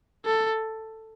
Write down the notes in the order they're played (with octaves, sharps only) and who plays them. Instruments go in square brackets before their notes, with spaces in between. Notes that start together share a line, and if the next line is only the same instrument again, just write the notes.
[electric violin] A4